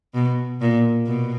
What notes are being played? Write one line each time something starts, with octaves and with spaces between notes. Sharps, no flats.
B2
A#2
B2